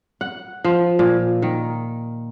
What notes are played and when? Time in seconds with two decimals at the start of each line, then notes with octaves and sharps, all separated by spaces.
0.21 F#5
0.64 F3
0.99 A#2
1.42 D#3